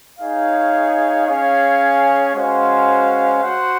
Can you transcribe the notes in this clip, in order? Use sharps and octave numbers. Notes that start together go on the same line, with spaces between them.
D#4 G#4 C#5 F5
C#4 G#4 C#5 F5
G#3 C#4 F#4 C5 F5
F#4 C5 F#5